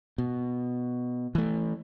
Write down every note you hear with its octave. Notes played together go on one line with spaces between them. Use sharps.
B2
E3 A3